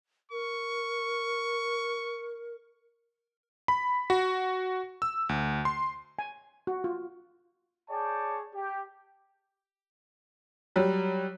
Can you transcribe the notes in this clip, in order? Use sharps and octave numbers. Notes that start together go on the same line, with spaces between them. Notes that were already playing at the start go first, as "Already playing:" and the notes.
A#4 C#6
B5
F#4
E6
D2
C6
G#5
F#4
F4
G#4 C#5 D5 G5 A5
G4
F#3 G3